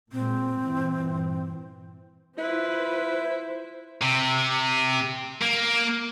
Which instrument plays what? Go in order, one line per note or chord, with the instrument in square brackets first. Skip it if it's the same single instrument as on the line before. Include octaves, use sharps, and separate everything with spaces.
[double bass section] A#2 G#3 [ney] C4
[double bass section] G2 A#2 E3
[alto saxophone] E4 [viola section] F4 B4 [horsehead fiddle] C5
[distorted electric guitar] C3
A#3